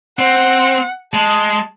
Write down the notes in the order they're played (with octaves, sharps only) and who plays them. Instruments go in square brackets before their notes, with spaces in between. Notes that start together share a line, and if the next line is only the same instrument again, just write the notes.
[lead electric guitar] C4 [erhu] F#5
[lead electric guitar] G#3 [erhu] A5